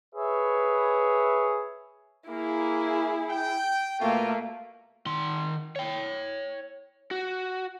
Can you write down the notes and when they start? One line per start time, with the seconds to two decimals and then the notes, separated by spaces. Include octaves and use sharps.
0.14 G#4 B4 C#5 E5
2.29 A#3 E4 G#4
3.30 G5
4.00 B2 A3 A#3 F4
5.06 D#3 C6
5.76 C#5 G5
7.11 F#4